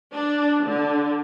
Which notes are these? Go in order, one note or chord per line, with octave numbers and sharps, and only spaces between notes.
D4
D3